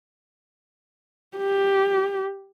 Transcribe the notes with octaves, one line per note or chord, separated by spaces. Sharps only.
G4